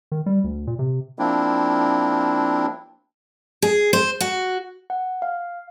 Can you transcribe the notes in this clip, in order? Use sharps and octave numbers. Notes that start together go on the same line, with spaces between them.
D#3
G3
D2
A#2
C3
F3 A#3 C4 D4 E4
G#4
C5
F#4
F#5
F5